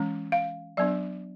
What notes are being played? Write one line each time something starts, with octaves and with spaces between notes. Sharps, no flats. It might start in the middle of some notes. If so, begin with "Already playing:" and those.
Already playing: E3 G#3 C#4
F5
F#3 B3 D4 D5